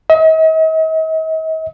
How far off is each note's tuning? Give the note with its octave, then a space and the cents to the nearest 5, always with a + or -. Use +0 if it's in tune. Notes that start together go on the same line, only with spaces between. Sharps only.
D#5 +45